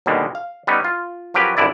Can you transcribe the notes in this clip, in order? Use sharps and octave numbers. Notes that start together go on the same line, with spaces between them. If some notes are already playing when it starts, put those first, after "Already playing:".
D#2 B2 D3 G3 G#3
F5
G3 B3 C#4 D#4
F4
F3 F#3 C#4 G4 A#4 B4
G#1 G2 D3 E4 D5